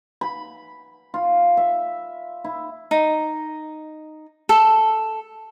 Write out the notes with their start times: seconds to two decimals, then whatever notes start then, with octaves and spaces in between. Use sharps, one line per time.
0.21 B5
1.14 F4
1.57 E5
2.44 E4
2.91 D#4
4.49 A4